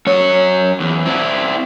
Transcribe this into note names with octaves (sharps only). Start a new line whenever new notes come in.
F#2 C#5
E2
C4 E4